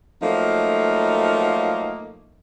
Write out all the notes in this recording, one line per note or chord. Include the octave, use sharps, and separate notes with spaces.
F3 F#3 A3 A#3 D#4